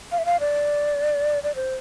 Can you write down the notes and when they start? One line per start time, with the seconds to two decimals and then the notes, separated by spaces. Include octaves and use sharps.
0.12 F5
0.18 E5
0.25 F5
0.40 D5
1.44 D5
1.55 C5